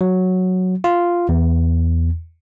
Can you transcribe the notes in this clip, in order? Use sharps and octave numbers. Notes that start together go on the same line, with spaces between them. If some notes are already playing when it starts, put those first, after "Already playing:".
F#3
F4
E2